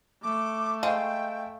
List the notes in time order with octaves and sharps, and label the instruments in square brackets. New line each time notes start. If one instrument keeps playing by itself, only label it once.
[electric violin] A3 [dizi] D6
[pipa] G#3 [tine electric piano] F5 [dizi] G5